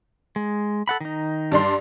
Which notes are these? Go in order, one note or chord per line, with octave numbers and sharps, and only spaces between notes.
G#3
A4 F#5 B5
D#3 D#4
G2 D5 C6